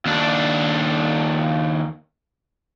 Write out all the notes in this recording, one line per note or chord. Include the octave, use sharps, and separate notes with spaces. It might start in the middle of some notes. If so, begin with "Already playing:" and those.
D#2 D4